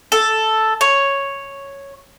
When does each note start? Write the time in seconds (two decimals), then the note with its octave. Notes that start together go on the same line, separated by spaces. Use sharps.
0.12 A4
0.81 C#5